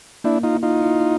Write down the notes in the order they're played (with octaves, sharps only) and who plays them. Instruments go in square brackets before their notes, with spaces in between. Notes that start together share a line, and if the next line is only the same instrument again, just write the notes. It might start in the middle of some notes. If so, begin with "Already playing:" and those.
[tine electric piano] A#3 [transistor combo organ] D4 E4
[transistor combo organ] D#4 F4
[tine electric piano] E4
[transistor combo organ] D#4 F4
[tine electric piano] E4